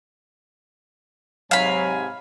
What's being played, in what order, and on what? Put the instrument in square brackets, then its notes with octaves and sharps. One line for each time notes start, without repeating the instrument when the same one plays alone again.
[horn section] G#2 C3 G#5 [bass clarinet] F#3 [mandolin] F5 B5